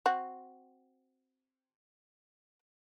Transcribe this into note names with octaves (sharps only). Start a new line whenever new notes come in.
C4 F#4